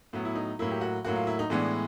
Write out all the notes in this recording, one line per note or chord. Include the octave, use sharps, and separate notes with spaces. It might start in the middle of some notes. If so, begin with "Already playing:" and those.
A2 F#3 B3
E4
D#4
A2 F#3 A#3 E4
G4
F#4
A2 F#3 A#3 F#4
F4
E4
D#4
A2 E3 G#3 B3 D4